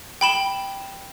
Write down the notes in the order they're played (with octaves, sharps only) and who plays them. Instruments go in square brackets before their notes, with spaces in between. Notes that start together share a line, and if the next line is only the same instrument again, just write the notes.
[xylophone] G5 B5 E7 G7